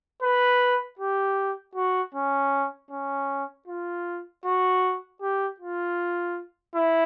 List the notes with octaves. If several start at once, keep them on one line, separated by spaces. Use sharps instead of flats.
B4
G4
F#4
C#4
C#4
F4
F#4
G4
F4
E4